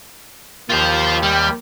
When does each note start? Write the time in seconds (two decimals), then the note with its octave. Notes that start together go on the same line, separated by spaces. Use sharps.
0.70 D#2 D#3 F4 G4 C5
1.23 G3